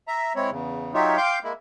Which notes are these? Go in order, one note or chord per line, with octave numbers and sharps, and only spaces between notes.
E5 A#5
G#3 C4 E4 C#5
E2 C#3
F#3 D#4 F4 G4 C#5 E5
F5 G5 C6 D6 G6
G#3 A#3 E4